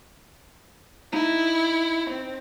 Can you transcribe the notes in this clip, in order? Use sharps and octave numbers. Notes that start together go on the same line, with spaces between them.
D#4 E4
C4